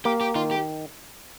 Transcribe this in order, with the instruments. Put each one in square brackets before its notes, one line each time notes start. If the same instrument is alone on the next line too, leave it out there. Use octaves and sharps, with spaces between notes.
[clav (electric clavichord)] A#3 [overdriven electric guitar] G4
[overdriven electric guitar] G4
[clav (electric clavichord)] D#3 [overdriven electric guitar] F4
[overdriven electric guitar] G4